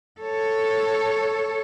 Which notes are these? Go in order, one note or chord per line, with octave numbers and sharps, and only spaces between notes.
A4 C#5